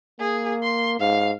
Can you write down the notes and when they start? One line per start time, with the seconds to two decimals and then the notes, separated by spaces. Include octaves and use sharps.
0.19 A#3 G#4
0.63 C6
1.00 G#2 F5